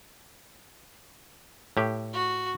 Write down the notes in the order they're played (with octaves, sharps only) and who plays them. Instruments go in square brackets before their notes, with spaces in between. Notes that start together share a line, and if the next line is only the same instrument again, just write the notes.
[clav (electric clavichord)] A2 G4
[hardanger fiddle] F#4